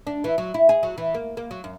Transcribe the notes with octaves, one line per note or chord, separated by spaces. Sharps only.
D4
E3
F#3
E4
G#4
F#3
E3
A#3
A#3
F#3
F#2